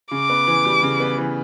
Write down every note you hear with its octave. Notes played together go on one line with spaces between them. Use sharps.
C#3 D6
B3
E3
G3
C#3
B3
E3